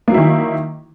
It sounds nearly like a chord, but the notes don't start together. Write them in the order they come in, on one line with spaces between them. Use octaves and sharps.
A#3 F#3 E4 D#3